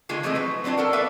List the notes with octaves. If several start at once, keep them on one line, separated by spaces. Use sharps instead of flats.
D3 D#3 G#3 A#3 F4 G#4
E3 F3 A3 C4 G#4 D#5
F#3 B4
F#3 C4 D4 D#4 F4
A4 A#4 F#5
B3 B4 D5 E5 F5